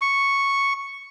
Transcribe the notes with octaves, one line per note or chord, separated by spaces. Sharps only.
C#6